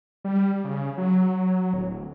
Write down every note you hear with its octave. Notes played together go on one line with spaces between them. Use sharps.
G3
C#3
F#3
D1